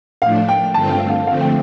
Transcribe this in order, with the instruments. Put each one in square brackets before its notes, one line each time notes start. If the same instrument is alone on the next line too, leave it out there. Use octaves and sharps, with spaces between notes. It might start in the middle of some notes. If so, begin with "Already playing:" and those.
[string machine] A2 F3 A3 D4 [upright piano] F5
[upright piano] G5
[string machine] G2 D3 A3 C4 F4 [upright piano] A5
[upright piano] G5
F5
[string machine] D3 F3 A3 C4 [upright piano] F5
[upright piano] G5